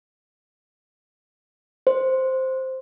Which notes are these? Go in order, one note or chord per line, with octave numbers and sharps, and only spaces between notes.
C5